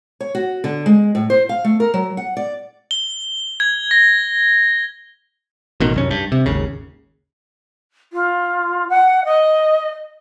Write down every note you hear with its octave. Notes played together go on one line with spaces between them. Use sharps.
C#5
F#4
D3
G#3
A2
C5
F5
A3
A#4
F#3
F#5
D5
G7
G#6
A#6
A1 B2 D#3
C2 F#2 C#4
G2
C3
G#1 D#2 C#3
F4
F#5
D#5